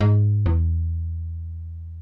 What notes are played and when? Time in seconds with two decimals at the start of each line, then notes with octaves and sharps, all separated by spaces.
0.01 G#2
0.46 E2